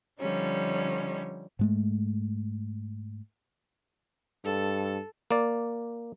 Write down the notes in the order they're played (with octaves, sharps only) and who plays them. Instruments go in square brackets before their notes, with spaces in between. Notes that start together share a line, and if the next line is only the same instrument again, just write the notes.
[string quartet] D3 F3 G3 C#4 D#4
[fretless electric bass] G#2 G#3 A3
[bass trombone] G2 [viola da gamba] A4
[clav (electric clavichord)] A#3 D5